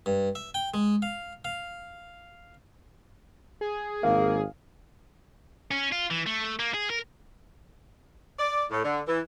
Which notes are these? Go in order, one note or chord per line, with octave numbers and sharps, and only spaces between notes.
G2
E5
G5
G#3
F5
F5
G#4
G#1 A#3 F5
C#4
F4
E3
A3
A#3
G#4
A#4
D5
A2
D3
E3